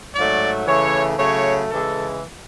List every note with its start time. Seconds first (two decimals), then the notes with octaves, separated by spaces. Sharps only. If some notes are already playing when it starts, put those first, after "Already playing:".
0.14 G#2 F#3 A3 D5
0.66 C#3 E3 A3 C#5
1.18 C#3 F#3 A3 C#5
1.69 C#3 E3 G#3 A4